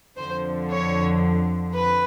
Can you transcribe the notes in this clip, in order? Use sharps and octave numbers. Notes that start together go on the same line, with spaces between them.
F2 D3 F3 C5
C#5
B4